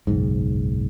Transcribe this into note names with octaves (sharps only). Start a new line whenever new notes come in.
F#1 B1 G#2